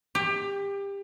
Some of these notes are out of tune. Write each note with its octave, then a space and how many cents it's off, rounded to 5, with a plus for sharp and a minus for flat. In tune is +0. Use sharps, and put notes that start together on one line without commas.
G4 +25